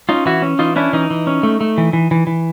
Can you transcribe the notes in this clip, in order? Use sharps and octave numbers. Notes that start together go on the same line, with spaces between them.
C#4 D#4 F4
E3 E4 F#4
C#4
E3 D#4 F4
C#4 D4 E4
E3 D#4
E3
C#4
A3
A3
E3
E3
E3
E3